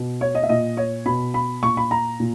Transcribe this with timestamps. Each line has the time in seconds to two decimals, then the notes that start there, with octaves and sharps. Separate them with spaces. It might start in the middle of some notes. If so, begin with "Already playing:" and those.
Already playing: B2
0.21 C#5
0.35 D#5
0.43 E5
0.49 A#2 D#5
0.77 C#5
1.06 B2 B5
1.34 B5
1.62 A#2 C#6
1.77 B5
1.91 A#5
2.20 A#2